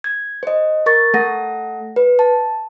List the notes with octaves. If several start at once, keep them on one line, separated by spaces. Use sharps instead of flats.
G#6
C5 D#5
A#4 C#6 A6
A3 A4 F#5 A#6
B4
A5